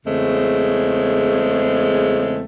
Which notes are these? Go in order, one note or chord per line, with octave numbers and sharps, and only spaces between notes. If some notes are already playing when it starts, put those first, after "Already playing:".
E2 C#3 G#3 A3 C4